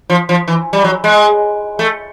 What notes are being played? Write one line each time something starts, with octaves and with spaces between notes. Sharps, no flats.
F3
F3
E3
G3
F#3
G#3
A3